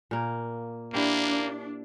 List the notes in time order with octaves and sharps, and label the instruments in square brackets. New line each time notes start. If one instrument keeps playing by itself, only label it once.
[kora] A#2 A#3
[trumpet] A#3 [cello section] D4 [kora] E4 G4 C5